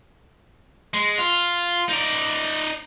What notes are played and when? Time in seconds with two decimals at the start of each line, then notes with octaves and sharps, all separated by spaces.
0.94 G#3
1.18 F4
1.89 D#4 D5